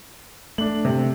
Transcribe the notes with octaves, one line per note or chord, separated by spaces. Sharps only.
A3 D4 F#7
C3